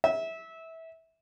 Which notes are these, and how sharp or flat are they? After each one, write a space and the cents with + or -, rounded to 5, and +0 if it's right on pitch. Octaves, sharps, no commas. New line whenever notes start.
E5 -20